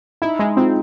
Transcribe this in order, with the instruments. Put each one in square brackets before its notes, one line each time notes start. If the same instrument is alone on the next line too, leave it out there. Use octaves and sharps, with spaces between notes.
[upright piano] D#4 [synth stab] E4
[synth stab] G#3 [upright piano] D#4
[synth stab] C4 [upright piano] D#4 F4